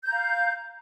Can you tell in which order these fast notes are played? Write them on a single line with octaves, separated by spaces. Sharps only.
G6 A#5 F5